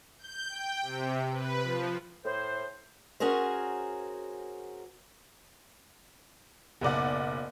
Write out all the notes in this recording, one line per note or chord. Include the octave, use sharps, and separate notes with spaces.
G6
G5
C3
B4
F3
A2 C5
C#4 F#4 G#4 A#4 C5
F#1 B1 D5 F#5